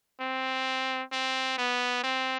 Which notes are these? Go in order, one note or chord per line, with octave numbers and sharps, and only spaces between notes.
C4
C4
B3
C4